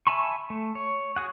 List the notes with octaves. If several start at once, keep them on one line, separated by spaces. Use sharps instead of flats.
E5 G#5 A5 B5 C#6
A3
C#5
F#4 G#4 F#5